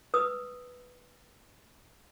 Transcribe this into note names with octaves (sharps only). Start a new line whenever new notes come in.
B4 D#6 E6